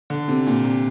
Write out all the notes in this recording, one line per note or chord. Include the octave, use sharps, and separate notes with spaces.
D3
C3
A#2
C3